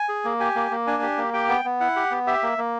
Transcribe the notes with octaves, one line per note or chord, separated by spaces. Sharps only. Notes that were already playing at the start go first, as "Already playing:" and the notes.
Already playing: G#5
G#4
A#3
G4 G#5
A#3
A#3
D4 G#5
G4
A#3
G4 G5
B3
B3
E4 F#5
G4
B3
G4 E5
A#3
A#3